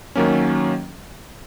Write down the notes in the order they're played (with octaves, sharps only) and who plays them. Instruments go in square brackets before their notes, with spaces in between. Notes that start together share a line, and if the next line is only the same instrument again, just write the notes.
[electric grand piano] D#3 F#3 A#3 C#4